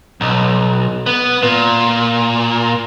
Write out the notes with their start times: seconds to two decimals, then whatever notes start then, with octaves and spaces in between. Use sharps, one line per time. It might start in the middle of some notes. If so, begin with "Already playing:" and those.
0.21 B1
1.06 B3
1.42 A#2